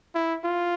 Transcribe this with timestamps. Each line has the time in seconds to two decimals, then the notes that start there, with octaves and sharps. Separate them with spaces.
0.15 E4
0.44 F4